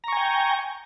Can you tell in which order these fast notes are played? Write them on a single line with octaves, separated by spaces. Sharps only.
A#5 C#6 G#5 G5